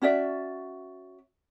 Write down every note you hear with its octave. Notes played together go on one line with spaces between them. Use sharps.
C#4 F#4 D5 E5